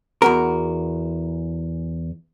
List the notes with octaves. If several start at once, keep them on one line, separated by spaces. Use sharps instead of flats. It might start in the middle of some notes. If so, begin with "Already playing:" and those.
E2 F#4 A#4